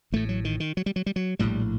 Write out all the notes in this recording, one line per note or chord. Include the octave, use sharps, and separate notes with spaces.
A1 A2 A3
F#3
D#3
D#3
F#3
G3
F#3
G3
F#3
A#1 A2 G3